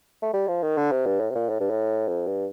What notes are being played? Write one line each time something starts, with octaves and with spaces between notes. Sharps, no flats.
A3
G3
F3
D#3
D3
C3
G2
A2
C3
A#2
A2
G2
A2
F2
G2